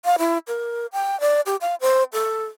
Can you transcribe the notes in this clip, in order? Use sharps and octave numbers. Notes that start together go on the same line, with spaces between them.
F5
E4
A#4
G5
D5
G4
F5
C5
A4